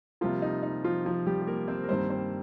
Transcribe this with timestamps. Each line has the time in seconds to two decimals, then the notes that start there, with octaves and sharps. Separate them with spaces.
0.21 C3 F3 G3 A#3 F4
0.42 D#4
0.63 D#4
0.84 F3 F4
1.05 F3 F4
1.27 G3 G4
1.42 G4
1.47 A#3 A#4
1.68 C4 C5
1.84 A#4
1.89 G2 D#3 G3 A#3 C4 C5
2.10 C4 C5